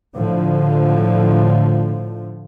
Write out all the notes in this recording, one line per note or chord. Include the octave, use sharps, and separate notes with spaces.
A2 D3 F3